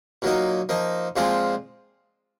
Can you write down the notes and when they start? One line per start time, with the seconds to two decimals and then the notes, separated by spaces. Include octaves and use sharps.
0.22 A#2 F#3 A#3 D#4
0.69 F3 A#3 D#4
1.16 A#2 F3 G#3 C4 F4